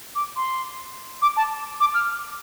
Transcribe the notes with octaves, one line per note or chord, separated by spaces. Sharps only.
D6
C6
D6
A5
D6
F6